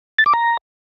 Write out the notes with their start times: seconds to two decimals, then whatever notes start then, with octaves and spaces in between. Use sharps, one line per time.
0.18 A6
0.26 D6
0.34 A#5